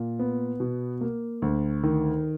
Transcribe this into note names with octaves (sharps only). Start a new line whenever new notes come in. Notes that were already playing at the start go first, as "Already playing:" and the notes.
Already playing: A#2
B3
B2
A#3
D2
D#3